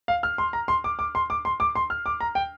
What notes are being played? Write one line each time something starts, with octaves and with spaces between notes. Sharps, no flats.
F5
F6
C6
A#5
C6
D6
D6
C6
D6
C6
D6
C6
F6
D6
A#5
G5